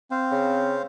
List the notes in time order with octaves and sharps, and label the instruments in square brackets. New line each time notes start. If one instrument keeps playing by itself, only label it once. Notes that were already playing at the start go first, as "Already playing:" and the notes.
[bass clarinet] C4 [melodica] C5 F5
[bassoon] C#3